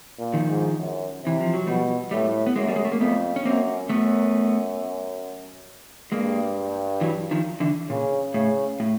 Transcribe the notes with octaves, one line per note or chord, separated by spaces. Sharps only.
A#2
D#3 F3
G#2
F#2
C3 E3
F3
F#3
B2 F3 G3
A2 G3 A3
B3
F#2 G#3 A#3
G3
G#3
A3
A#3
F2 A3 B3
C#4
F#2 A#3 C4
F#2 A3 B3
G2 G#3 A#3
E3 F#3
D#3 F3
D3 E3
A#2 C#3
A2 C#3
A2